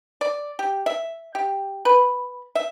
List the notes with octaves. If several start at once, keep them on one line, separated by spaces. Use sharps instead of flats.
D5
G4
E5
G4
B4
E5